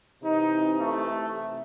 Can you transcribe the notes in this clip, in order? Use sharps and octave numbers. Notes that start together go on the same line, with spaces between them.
C3 E3 D#4
A3